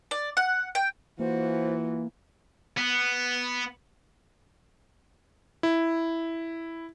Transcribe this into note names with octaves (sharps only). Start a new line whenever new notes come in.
D5
F#5
G5
E3 A#3 F4 F#4 C5
B3
E4